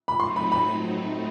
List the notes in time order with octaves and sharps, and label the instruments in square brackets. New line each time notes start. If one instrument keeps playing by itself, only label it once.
[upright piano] B5
[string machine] F#3 A3 C4 D#4 [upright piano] C6
[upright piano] B5
B5